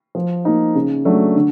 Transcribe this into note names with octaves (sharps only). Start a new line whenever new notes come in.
F3
A#3 D#4
C#3
F#3 A3 D4
D3